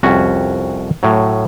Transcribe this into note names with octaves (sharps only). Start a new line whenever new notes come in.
C2 F2 C#4 F#4
A2 F#3